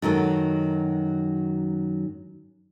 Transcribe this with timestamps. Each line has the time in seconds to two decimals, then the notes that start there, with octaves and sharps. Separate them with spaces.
0.02 F#2 D#3 F#3 A4